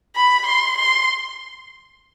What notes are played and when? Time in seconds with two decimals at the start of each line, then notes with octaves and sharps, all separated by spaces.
0.15 B5
0.46 C6
0.77 C6